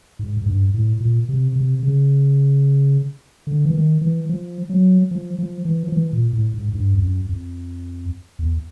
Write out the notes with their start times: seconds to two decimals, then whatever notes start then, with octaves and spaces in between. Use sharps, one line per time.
0.19 G#2
0.37 G#2
0.46 G2
0.74 A2
1.00 A#2
1.29 C3
1.56 C3
1.83 C#3
3.47 D3
3.65 E3
3.74 D#3
4.01 E3
4.29 F3
4.69 F#3
5.11 F3
5.38 F3
5.65 E3
5.83 F3
5.92 E3
6.13 A#2
6.33 A2
6.54 G#2
6.68 G#2
6.75 G2
6.95 F2
7.02 F#2
7.29 F2
8.39 E2